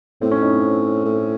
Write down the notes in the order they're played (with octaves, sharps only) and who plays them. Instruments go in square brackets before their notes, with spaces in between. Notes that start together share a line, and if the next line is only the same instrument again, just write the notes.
[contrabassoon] A2 [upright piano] C4
[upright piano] C#4
D#4
C4
[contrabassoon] A2